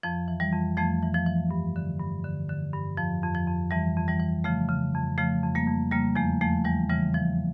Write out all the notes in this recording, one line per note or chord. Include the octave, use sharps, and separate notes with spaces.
F2 F3
E3
E3 G3
F2
F2 F3 A3
E3
F3
E3
G2
D3
G2
D3
D3
G2
F2 F3
F2
F3
F2
F2 E3 G3
F2
E3 G3
E3
C#3 F3 A3
C#3
F2
C#3 F3 A3
F2
G3 A#3
F2
C#3 G3 A#3
E2 F3 A3
E2 F3 A3
E2 E3 G3
C#3 E3 G3
E3 F3